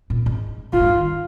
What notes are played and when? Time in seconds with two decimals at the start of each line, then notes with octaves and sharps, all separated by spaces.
0.10 A#2
0.26 G#2
0.73 G#2 F4
0.80 G#3
0.85 F3
0.96 D#3